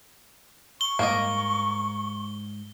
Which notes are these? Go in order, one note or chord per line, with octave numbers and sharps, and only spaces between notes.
C#6 G7
G#2 G3 A#3 A#4 D#5